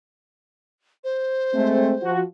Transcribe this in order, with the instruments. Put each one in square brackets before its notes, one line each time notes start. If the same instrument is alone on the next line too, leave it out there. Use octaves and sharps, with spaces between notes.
[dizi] C5
[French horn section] G#3 A3 C4
F3 F#4